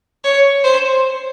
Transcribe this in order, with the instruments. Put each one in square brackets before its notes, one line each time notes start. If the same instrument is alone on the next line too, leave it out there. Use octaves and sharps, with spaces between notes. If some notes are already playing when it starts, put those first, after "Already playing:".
[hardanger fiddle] C#5
C5